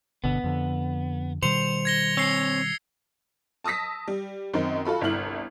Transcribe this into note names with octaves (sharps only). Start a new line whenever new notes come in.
G1 B2 D3 B3
F2 D3
B2 D#3 G3 C5 C#7 F7
G#6 A#6 G7
C4 C#5 E6 A#6 C7
A5 D#6 E6 A#6 B6
G3
F#2 D#3 C4 D#4
F4 F#4 A4 B5
G1 C2 E4 F6 F#7